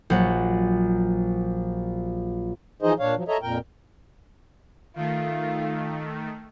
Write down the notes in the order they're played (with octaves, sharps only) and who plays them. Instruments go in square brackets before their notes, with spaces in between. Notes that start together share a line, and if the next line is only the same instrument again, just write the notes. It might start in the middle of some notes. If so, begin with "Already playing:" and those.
[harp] A#1 F#3 F#5
[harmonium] E3 F3 D#4 G#4 C5 D#5
A#2 D4 C#5 F5
F3 F#3
A4 C#5 D#5 E5 A#5
F2 A#2 A#4 G5
[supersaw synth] D#3 A3 [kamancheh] F4